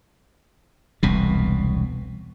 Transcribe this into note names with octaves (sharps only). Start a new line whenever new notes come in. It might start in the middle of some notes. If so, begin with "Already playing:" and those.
E1 C2 B2